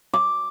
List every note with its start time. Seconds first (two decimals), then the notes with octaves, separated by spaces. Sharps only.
0.14 D6